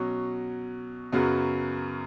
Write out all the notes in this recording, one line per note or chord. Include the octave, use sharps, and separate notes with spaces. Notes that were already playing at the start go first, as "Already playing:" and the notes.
Already playing: B2 F#3 C#4
F#2 C#3 F#3 B3 F#4